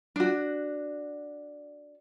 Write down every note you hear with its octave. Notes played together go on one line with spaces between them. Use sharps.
D4 F#4